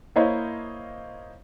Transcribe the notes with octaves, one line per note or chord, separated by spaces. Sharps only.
A#3 E4 C5 C#5 D#5 F5